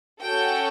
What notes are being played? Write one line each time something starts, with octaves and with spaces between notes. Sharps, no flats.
C#4 F#4 A4 G5